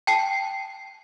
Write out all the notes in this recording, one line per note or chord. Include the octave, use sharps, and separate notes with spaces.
G5 A5 C7